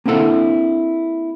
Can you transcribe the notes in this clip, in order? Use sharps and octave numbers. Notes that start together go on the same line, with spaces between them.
A#3 C4 D4 E4 A4 F#5